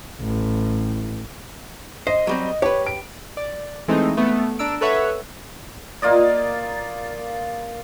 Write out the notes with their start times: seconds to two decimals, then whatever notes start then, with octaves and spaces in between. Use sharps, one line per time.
0.21 A1
2.07 C5 D#5
2.27 F#3 G3 C4
2.62 G4 B4 C#5
2.87 D7
3.37 D5
3.88 E3 G#3 A3 C4 D#4
4.17 A3 B3
4.59 D4 A#5 E6 D7
4.81 A4 B4 C#5 E5 F#5
6.02 A#3 F4 D5 D#5